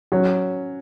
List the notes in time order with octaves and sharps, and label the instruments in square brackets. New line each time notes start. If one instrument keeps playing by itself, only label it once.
[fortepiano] F#3 [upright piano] C#4 C#5